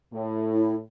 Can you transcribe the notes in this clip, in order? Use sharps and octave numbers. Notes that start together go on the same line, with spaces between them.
A2
E4